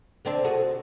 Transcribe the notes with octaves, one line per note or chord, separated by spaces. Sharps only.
D3 C4 D4
F#4 G#4 A4